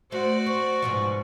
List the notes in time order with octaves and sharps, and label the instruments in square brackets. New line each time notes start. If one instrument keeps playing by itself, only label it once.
[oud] A3 [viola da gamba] F#4 D5 [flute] C5
[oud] C4 [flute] C#6
[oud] G#2 B2 F3